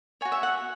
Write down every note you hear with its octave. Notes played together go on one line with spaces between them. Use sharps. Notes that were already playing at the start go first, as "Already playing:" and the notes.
F#4 C#5 G#5
E5
F#5